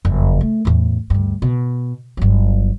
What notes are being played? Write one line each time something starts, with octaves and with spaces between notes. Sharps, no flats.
F#1 F2
A3
E2 A2
D2 G2
B2
G1 F#3